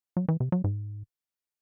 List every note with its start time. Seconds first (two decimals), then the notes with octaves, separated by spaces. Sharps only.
0.17 F#3
0.28 E3
0.40 C3
0.52 F#3
0.64 G#2